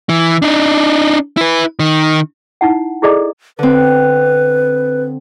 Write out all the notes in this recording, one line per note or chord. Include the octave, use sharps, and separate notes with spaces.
E3
D4 D#4
E4 B4
D#3
D#4 E4 F#5
E4 G#4 A4 D5 D#5 A#5
D3 C4 B4